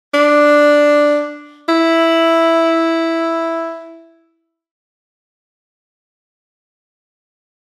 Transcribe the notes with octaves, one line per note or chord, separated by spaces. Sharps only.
D4
E4